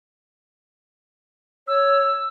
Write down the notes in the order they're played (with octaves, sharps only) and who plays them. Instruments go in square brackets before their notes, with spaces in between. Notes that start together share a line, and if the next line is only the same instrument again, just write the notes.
[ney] C#5 [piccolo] E6